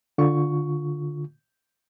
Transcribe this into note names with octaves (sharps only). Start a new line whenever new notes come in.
D3 F4 C#6